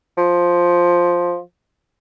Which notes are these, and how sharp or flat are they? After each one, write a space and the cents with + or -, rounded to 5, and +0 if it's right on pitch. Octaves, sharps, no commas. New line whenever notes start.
F3 +5